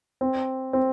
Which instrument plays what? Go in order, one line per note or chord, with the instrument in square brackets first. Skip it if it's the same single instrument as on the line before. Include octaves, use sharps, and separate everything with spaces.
[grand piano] C4
C4